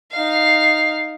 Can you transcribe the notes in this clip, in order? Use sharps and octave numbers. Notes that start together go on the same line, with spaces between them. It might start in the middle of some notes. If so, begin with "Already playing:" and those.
D#4 F5